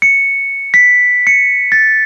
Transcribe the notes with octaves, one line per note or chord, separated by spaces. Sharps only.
C#7
B6
C#7
A6